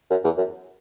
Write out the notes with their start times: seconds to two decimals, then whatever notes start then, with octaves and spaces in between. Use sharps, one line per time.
0.10 F#2
0.24 E2
0.37 F#2